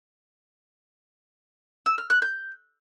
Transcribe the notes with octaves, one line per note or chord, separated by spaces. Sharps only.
E6
F6
F#6
G6